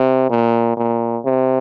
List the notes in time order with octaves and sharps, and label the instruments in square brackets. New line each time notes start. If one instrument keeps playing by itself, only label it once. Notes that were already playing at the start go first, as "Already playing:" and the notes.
Already playing: [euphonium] C3
A#2
A#2
C3